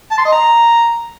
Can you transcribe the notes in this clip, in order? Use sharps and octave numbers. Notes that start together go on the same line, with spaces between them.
A5
C6
D#5
A#5